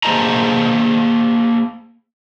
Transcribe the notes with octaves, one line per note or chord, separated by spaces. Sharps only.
A#3 G#4 C5 D#5 A5 A#5